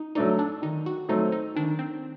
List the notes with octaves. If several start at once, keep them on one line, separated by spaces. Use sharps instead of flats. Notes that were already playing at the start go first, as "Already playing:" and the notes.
Already playing: D#4
F#3 A3 D4 D#4
D4
D#3 D#4
F#4
F#3 A3 C4 D#4
D#4
D#3 D4
C4